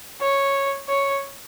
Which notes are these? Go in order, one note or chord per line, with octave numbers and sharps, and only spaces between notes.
C#5
C#5